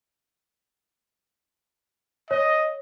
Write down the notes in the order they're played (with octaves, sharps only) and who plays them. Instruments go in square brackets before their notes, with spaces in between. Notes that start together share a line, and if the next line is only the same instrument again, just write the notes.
[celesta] C#5 [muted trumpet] D#5